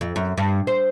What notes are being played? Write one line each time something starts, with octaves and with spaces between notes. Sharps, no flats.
F2
F#2
G2
C5